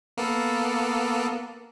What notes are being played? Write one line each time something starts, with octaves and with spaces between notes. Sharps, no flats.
A#3 B3 A4